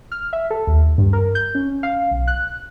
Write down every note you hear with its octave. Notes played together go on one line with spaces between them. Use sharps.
F6
E5
A4
D#2
G2
A#4
G6
C#4
F5
B1
F#6